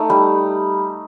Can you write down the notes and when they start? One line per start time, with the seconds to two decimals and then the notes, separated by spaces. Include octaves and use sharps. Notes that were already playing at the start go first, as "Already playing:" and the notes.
Already playing: A3 D#4
0.10 G3